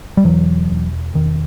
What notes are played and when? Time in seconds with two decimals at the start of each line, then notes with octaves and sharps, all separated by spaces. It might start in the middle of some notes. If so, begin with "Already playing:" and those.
0.17 G3
0.24 E1 E3 F#3
0.70 E1
1.14 E1 D#3